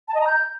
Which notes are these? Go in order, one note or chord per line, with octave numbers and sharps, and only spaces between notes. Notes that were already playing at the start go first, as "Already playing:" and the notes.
A5
D#5
A#5
G6